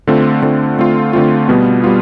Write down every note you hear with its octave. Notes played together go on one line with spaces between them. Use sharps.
D3 A3 C4 F4
D3 A3 C4 F4
D3 A3 C4 F4
D3 A3 C4 F4
B2 G3 B3 F4
G3 B3 F4